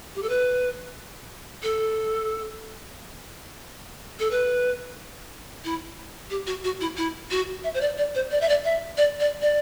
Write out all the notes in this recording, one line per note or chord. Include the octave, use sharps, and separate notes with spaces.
G4
A4
B4
A4
A4
B4
E4
G4
F#4
F#4
E4
E4
F#4
E5
C5
D5
D5
C5
D5
E5
D5
E5
D5
D5
D5